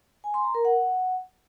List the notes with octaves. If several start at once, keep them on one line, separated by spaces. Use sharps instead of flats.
G#5
C6
A#5
A#4
F#5